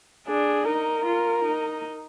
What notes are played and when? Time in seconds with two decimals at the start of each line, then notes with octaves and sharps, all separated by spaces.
0.27 D4 G#4
0.65 D#4 A#4
1.05 F4
1.44 D#4